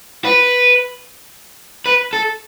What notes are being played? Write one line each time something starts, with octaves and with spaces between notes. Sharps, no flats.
B4
B4
A4